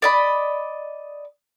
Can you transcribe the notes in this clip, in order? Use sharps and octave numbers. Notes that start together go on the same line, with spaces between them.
D5 D#5 B5